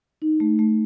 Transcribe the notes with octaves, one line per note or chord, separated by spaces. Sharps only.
D#4
A3
A3